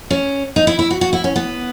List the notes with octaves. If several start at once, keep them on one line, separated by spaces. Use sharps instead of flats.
C#4
D#4
E4
E4
F#4
F#4
E4
C#4
B3